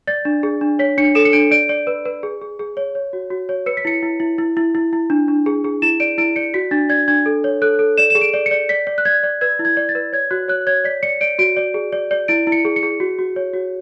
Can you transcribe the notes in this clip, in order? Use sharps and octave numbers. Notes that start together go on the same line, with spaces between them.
D5 A6
D4
G#4
D4
C#5 B6
D4 C#7
A4 E7
C#7
D4 D7
D5 D7
D5
B4
B4
G#4
G#4
G#4
C#5
C#5
F#4
F#4
C#5
B4 C#7
B6
E4 C#7
E4
E4
E4
E4
E4
E4
D4
D4
G#4
G#4
E4 E7
D5 D7
E4 D7
D5 C#7
F#4 B6
D4 A6
D5 G#6
D4 G#6
A4
C#5
A4 F#6
A4
D5 E7
G#4 E7
D7
D5
C#7
D5
D5 B6
D5
F#6
D5 G#6
D5
B4 G#6
E4
G#6
D5
A6
B4
C#5 G#6
F#4 F#6
C#5 F#6
C#5 G#6
D5 B6
D5 C#7
D5 D7
F#4 D7
D5
G#4
D5
D5
E4 D7
E4
C#7
G#4
C#7
G#4
F#4
F#4
C#5
F#4